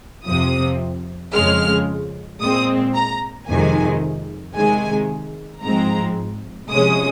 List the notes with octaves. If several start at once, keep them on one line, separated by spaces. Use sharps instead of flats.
F2 C3 F3 C4 D#6
F2 C#3 G#3 F6
A#2 G#3 C4 D#6
A#5
F2 C3 D#3 G#3 G#5
C3 D#3 G#3 G#5
G#2 F3 G#3 C4 A#5
C3 F3 G#3 C#4 D#6